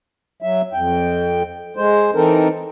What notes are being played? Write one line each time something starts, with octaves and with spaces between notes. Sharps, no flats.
F#3 E5
F2 G5
G#3 C5
E3 C4 D#4 A4 A#4